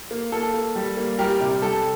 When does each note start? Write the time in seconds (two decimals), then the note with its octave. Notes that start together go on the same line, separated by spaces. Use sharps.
0.11 A#3
0.32 A#3 A4
0.54 A#3
0.76 G3
0.97 A#3
1.19 G3 G4 A#4
1.41 C3
1.62 G3 A4